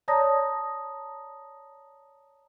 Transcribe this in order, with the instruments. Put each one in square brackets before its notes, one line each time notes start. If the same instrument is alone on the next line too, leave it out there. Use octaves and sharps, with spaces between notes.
[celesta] C#5 D5 A5 A#5 D#6 A#6